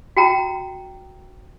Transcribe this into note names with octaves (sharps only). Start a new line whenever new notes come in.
F#4 G5 A#5